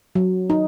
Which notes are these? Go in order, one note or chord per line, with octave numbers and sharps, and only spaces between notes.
F#3
D#4